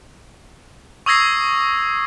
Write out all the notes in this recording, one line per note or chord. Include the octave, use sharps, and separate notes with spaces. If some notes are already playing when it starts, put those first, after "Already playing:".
C#6 D#6 E6 G#6 A#6 C7